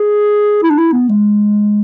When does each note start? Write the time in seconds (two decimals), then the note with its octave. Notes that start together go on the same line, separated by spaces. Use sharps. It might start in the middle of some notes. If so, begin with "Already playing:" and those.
Already playing: G#4
0.62 E4
0.70 D4
0.78 E4
0.92 B3
1.09 G#3